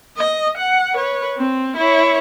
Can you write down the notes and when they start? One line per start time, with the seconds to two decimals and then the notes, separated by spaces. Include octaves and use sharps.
0.17 D#5
0.58 F#5
0.94 B4 C#5
1.38 C4
1.77 E4 C#5